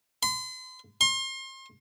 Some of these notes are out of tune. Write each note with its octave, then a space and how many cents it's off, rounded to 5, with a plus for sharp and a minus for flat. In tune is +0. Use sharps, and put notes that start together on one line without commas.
C6 -40
C6 +35